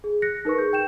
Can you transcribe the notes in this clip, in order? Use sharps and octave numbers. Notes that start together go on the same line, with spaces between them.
G#4
F#6 A#6 C#7
D#4 A#4 B4 C#6
G#4 G6
G5 G6 E7